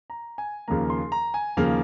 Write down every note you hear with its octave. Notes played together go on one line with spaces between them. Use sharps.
A#5
G#5
D#2 C#3 F3 A#3 A#5
C6
A#5
G#5
D#2 C#3 F3 A#3 F5